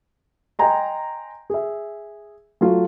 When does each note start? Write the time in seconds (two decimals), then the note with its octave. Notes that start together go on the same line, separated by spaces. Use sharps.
0.59 D#5 G5 G#5 A#5 C6
1.50 G#4 E5
2.61 F#3 A3 F4